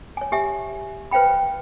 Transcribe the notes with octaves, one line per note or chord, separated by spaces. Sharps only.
C#5 G#5
G4 E5 G#5
B4 C5 F5 G5 B5